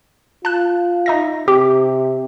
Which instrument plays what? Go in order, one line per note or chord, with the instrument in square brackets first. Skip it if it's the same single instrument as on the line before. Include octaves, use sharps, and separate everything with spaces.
[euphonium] F4 [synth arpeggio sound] A5 F#6
[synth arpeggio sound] D#4 E5 A#6
[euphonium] C3 [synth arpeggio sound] G4